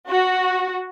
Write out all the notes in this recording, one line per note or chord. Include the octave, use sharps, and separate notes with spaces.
F#4